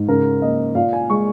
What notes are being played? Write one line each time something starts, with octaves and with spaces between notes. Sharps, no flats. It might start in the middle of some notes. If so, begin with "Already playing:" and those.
Already playing: G#2
C#3 A#4
A#3 D#5
A#2 F5
G#5
G#3 C#6